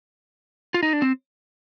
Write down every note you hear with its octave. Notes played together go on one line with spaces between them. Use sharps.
F4
D#4
D4
C4